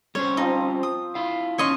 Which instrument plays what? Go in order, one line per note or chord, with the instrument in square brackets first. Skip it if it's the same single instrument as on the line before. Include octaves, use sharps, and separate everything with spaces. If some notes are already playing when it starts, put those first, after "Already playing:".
[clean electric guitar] G3 C#4 C5 [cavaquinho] C#5
[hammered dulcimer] F3 C4 F4 [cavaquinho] D#4
[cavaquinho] D#6
[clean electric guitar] E4 F5 [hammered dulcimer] B5
[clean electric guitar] D#2 C#4 D#4 [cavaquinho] C#5 D#5 C6